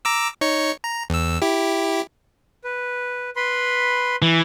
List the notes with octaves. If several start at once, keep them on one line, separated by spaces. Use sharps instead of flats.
A#5 D6 E6
D#4 C#5 C#7
A#5
E2 E6
E4 G4
B4
B4 B5 C6
E3